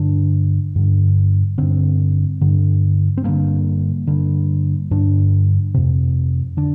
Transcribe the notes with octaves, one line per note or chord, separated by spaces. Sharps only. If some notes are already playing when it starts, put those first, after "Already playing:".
Already playing: G2 D3 D4
G2 D3
G2 D3 C4
G2 D3
C4
G2 D3 A#3
G2 D3
G2 D3 D4
F2 C3
D3 D4